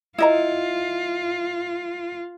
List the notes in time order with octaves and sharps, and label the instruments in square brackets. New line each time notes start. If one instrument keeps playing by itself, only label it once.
[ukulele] E4 D#5 A#5 [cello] F4